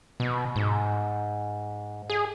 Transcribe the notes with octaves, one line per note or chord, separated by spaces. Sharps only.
B2
G#2
G#4